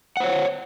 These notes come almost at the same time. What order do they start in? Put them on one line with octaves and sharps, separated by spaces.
F#5 C5 C#5